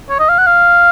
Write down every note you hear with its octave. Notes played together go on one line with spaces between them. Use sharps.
C#5
D#5
F5
F#5
F5